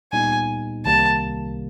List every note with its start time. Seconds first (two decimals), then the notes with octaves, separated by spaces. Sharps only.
0.12 A#2 G3 B3 D#4 G#5
0.85 C2 C3 D#3 G3 A#3 A5